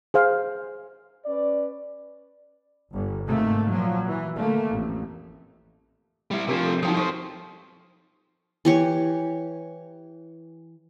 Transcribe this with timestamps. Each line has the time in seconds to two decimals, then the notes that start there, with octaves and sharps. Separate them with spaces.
0.14 G#4 C5 F5
1.25 C#4 B4 D5
2.91 G1
3.26 G#2 C3 A3 A#3
3.70 A#2 F3 F#3
4.07 E3
4.38 D3 A3 A#3
4.70 A1 F2
6.31 G3 E4
6.48 C3 F3 D4 G4 A#4
6.65 A4
6.83 F3 F#3 D#4 G5 D#6
6.97 F2 C5 C#6 D#6
8.65 E3 G4 C#5